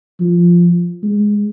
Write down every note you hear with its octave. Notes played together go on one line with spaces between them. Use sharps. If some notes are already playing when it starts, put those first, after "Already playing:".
F3
G#3